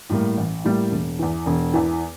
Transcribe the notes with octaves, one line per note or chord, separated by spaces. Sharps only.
A2 G3 A#3
A1
A2 G3 A#3
E1
E2 E3
E1
E2 E3